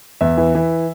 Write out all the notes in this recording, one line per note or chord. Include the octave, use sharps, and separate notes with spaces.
E2 E5
E3
E3